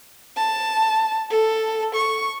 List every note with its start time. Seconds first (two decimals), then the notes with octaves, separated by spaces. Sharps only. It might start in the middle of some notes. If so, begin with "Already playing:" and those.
0.37 A5
1.31 A4
1.96 C#6